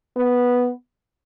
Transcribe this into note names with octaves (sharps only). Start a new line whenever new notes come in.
B3